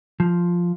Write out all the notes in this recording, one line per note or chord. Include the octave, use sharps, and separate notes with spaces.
F3